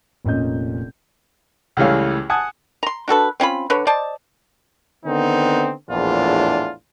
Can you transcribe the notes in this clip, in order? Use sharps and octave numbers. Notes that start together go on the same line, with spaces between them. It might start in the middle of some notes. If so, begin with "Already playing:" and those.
F1 A#2 C#4 D#5 G6
C#2 E3 G3 A3 C#4 F5
F#5 G#5 A5 D#6
A#5 C6
D4 F#4 A4 B4
C4 C#4 F4 B5
D3 B4 C#5
C5 D5 D#5 A5
D3 D#3 B3 C4 D#4
A#1 E2 A2 D4 F4